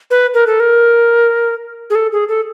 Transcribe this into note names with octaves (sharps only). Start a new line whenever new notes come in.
B4
A#4
A4
A#4
G#4
A4
G#4
A4